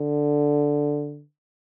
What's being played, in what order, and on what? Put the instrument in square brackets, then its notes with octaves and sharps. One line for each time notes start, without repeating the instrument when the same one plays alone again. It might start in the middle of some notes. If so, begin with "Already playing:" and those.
Already playing: [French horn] D3